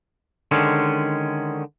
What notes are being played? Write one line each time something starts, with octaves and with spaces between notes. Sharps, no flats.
D3 D#3 G#3 C#4